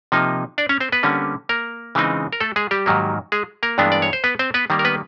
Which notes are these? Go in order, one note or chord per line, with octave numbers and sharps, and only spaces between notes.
C3 F3 A#3 D#4
D4 D5
C#4 C#5
C4 C5
B3 B4
D3 G3 A#3 C#4
A#3 A#4
C#3 E3 G#3 C4 D#4
A#4
A3 A4
G#3 G#4
G3 G4
G#2 D#3 F#3 A#3
G#3 G#4
A#3 A#4
G2 E3 G#3 B3 D4
D5
C#5
C5
B3 B4
C4 C5
B3 B4
D#3 G3 A#3
A#4
B3 B4